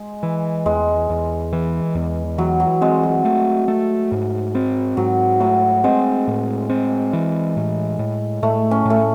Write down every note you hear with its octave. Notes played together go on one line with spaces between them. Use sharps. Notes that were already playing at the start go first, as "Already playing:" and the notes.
Already playing: G#3
E3
E2 G#3
E2
E3
E2
E3 F#3
F#3
G#3 C4
F#3
A3
A3
G#2
C4
G#2 F#3
F#3 A3
G#3 C4
A2
C4
E3
A2
A2
A2 A3
C#4
A2 A3